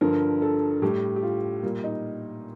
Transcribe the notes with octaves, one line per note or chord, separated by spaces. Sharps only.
G2 D3 F3 A#4
A4
A2 G3 G4
G4
F4
A#2 G3 F4
D#4